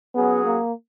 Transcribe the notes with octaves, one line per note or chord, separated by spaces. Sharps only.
F#3 B3 C#4 G#4
A#3